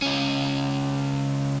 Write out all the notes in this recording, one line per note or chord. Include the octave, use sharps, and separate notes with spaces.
C#2 C#4